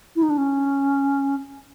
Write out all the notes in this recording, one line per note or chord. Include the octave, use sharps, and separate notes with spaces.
E4
D#4
D4
C#4